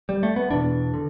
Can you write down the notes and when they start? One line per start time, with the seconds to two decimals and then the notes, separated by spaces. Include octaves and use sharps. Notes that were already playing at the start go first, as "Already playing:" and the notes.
0.09 G3
0.23 A3
0.36 B3
0.50 E2 B2 D4
0.94 D3